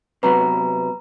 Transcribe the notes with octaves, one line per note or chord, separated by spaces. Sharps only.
C3 F#3 B3 B4 A#5